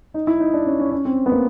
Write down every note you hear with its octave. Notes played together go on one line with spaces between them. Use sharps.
D#4
E4
D#4
D4
C#4
C#4
C#4
C4
B3
A#3